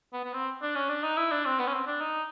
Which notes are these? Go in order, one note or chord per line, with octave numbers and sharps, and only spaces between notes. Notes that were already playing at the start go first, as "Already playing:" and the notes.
B3
B3
C4
D4
C#4
D4
D#4
E4
D4
C4
B3
C#4
C4
D4
D#4